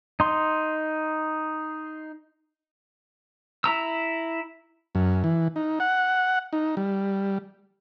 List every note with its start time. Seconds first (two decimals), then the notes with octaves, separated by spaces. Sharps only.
0.20 D#4 C6
3.64 E4 A#5 E6
4.95 F#2
5.24 E3
5.56 D#4
5.80 F#5
6.53 D#4
6.77 G3